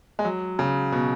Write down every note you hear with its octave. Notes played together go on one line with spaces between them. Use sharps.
G#3
F#3
C#3
B2